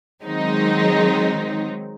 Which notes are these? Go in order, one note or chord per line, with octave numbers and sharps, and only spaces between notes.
D#3 F#3 G#3 C4 D#4